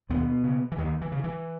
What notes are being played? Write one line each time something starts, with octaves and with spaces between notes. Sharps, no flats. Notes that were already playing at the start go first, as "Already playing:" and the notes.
D#2 B2 B3
C#3
E3
D#2 D#3
E3
C#3
E3